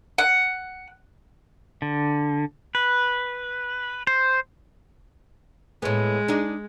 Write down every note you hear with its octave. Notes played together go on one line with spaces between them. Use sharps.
F#5
D3
B4
C5
A2 G#3 B3
D4 D#4 G#4